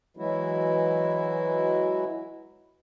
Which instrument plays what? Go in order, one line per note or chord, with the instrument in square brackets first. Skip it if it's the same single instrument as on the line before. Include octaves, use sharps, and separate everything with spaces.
[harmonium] E3 F#3 G#3 E4 F#4